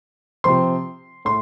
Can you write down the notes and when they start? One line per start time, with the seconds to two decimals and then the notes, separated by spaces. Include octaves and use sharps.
0.44 C3 F3 C4 C6
1.25 A2 C6